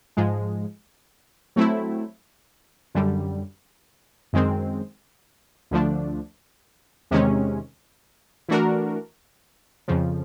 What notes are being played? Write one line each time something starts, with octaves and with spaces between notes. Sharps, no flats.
G#2 F3 G#3
F#3 A3 C4 E4
F#2 D3 G3
F#2 D#3 G#3 C4
D2 D3 F3 A3 D4
E2 C3 D#3 G#3 C#4
E3 A3 D4 F#4 A#4
F2 C#3 F3